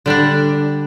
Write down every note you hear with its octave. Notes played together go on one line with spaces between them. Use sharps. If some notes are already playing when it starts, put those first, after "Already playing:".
D3 G3 D4